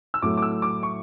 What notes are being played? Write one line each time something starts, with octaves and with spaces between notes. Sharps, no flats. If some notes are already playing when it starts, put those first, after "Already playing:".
E6
A2 F#3 A3 D6
D6
E6
D6
C#6